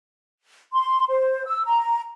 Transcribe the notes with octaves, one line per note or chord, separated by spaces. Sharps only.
C6
C5
E6
A#5